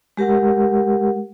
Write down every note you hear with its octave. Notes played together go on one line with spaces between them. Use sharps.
G#3 G4 A#4 F#5